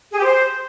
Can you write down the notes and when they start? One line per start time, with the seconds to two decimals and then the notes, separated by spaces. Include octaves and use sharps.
0.11 G#4
0.18 G4
0.24 C5